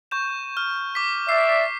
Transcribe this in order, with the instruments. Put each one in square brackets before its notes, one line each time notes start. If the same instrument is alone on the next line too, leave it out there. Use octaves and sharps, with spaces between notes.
[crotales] C#6 G6 E7
F6
D6 B6
[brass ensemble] D5 E5 [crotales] C7